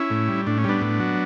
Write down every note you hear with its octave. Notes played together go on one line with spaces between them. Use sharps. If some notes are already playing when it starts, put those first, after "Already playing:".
Already playing: C#4 E4
A2
G3
A2 D4
C#4
G3 B3 D4
A2
F#3